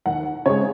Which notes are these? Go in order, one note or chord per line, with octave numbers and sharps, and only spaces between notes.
D#2 F#5
C#3 G#3 C#5